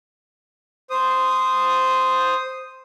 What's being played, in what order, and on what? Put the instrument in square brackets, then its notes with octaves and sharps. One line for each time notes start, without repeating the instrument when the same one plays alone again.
[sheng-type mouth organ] C5 D#6